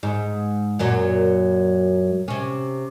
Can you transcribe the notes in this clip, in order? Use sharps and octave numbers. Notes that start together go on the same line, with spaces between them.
G#2
F#2 A#2 F#3
C3 C#4